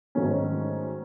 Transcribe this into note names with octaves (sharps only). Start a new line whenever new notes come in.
G#2 D#3 F#3 A3 C#4